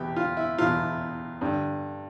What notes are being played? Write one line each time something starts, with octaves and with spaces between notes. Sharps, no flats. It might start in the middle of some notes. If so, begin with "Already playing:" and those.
Already playing: E2 B2 G4
F4
E4
E2 B2 F4
G2 D3